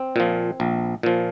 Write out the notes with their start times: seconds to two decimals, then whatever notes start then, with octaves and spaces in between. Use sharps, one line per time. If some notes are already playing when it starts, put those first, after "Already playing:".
Already playing: C4
0.16 A#2 F3
0.60 A#1
1.03 A#2 F3